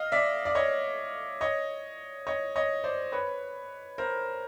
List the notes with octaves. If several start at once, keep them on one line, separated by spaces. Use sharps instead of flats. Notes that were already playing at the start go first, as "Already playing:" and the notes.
Already playing: D#5 F5
D5 E5
D5
C#5 D#5
C#5 D#5
C#5 D#5
C#5 D#5
C5 D5
B4 C#5
A#4 C5